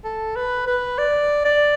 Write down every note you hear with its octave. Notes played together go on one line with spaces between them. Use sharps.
A4
B4
B4
D5
D5